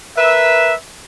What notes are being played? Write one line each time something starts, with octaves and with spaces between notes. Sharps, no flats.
A#4 B4 E5